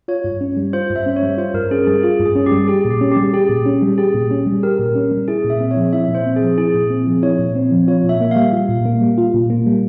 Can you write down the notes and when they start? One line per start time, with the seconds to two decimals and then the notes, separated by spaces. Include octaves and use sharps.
0.08 F4 C#5
0.24 G2
0.41 C#4
0.57 G3
0.73 F4 C5
0.90 G2
0.96 E5
1.06 C#4
1.16 C#5
1.23 G3
1.38 F4 C5
1.54 G2 A#4
1.71 C#4 G#4
1.87 G3 G#4
2.03 F4 G#4
2.20 G2
2.25 G#4
2.35 C#4
2.46 G4
2.51 G3
2.68 G4 G#4
2.85 A#2
2.90 G4
3.01 C#4
3.12 G4
3.17 G3
3.33 G4 G#4
3.49 A#2
3.66 C#4
3.82 G3
3.98 G4 G#4
4.14 A#2
4.31 C#4
4.46 G3
4.63 G4 A#4
4.79 A#2
4.95 C#4
5.11 G3
5.28 E4 G#4
5.44 A#2
5.50 E5
5.60 C4
5.71 C#5
5.77 F3
5.93 E4 E5
6.09 A#2
6.15 C5
6.26 C4
6.36 G#4
6.41 F3
6.57 E4 G#4
6.75 A#2
6.90 C4
7.07 F3
7.23 E4 C#5
7.39 A#2
7.55 C4
7.71 F3
7.88 F4 C#5
8.04 A#2
8.09 E5
8.20 A#3
8.31 G3 F5
8.53 F4
8.69 A#2
8.85 A#3
9.01 G3
9.18 F4
9.34 A#2
9.50 A#3
9.66 G3